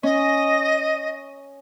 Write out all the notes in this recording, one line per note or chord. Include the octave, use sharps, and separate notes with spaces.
C#4 D#5